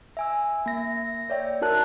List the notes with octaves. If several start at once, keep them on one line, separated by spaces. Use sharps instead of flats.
E5 G#5 E6
A#3 A#6
C#5 D5 E5 G5
D#4 F#4 A#4 A5 F#6